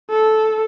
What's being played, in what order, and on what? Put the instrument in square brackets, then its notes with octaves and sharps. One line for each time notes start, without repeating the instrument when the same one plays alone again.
[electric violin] A4